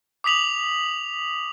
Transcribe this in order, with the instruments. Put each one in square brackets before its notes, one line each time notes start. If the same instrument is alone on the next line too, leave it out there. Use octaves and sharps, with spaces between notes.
[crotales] D6 D#6 B6 F7 F#7